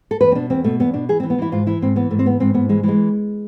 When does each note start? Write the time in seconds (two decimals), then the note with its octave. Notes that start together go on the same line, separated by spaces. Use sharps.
0.11 A4
0.21 E2 B4
0.32 C4
0.35 B2 D4
0.50 E2 C4
0.64 B2 A3
0.80 E2 B3
0.94 B2 D4
1.09 E3 G#4
1.20 C4
1.23 E3
1.30 B3
1.38 E3 E4
1.52 G#2 F4
1.66 E3 E4
1.82 G#2 C4
1.96 E3 B3
2.10 G#2 A3
2.19 C4
2.26 E3 B3
2.40 G#2 C4
2.54 G#2 B3
2.69 E3 G#3
2.83 E3 G#3